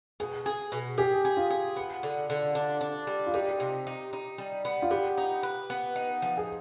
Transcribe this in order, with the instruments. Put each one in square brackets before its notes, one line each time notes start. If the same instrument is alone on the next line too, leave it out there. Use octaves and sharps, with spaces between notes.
[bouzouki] B2 [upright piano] G#4
[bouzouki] G#4
B2
[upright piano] G4 [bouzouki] G#4
[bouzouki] G#4
[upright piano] F4
[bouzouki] G#4
B3
D3
D3
D4
D4
G3
[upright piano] F4
[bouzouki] D#4 [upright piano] G4
[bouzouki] C3
D#4
D#4
G3
B3
[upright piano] F4
[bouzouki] B3 [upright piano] G4
[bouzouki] D#4
B4
B3
D#4
F3
[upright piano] G#4